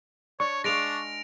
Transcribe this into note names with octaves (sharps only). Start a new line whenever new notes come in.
D4 C#5 C#6
G#3 D4 F5 A#6 D7 F7